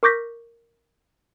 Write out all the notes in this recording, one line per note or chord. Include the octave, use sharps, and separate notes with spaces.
A#4 C#6 D6 G6 A#6 B6